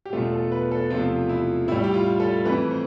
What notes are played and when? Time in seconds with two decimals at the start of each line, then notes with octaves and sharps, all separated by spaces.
0.05 G4
0.13 E2 B2 A3 F4
0.33 A4
0.52 B4
0.71 A4
0.90 E2 C3 F3 A3 F4
1.29 E4
1.68 A2 G3 E4
1.84 G4
1.94 F4
2.20 A4
2.45 F2 E3 A3 B4
2.71 C5